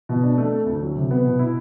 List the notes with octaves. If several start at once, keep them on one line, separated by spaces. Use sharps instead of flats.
B2
D4
A3
A4
D2
F#3
C3
B3
B2
E4